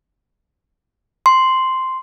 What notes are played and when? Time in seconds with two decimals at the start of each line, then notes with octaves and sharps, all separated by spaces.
1.26 C6